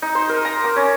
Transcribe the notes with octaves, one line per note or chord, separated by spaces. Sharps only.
D#4
C5
A#4
A#5
D6
C#4